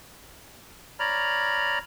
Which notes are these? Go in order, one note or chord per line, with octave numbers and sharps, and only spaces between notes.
C#5 D5 A#5 B5 F6